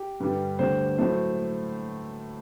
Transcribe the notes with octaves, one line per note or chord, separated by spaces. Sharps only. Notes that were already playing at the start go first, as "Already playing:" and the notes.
Already playing: G4
G2 D3 G3
D2 D3 G3 C5
A2 F#3 A3 C5